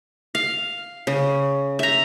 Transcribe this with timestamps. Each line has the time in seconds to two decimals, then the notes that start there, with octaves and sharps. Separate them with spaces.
0.35 F5
1.07 C#3
1.79 E5 A#5